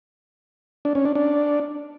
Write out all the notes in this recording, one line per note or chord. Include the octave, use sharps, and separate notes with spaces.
D4
C#4
D4
D4